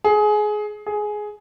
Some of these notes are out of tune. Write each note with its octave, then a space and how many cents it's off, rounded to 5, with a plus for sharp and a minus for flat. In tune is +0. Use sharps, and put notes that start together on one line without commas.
G#4 +20
G#4 +10